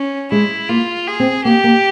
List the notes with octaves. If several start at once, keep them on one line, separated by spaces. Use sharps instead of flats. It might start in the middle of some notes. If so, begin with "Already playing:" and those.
Already playing: C#4
G#3 E4
A#3 F4
G#4
C4
A#3 G4
A#3